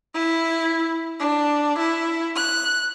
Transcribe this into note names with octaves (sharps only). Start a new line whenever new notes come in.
E4
D4
E4
F#6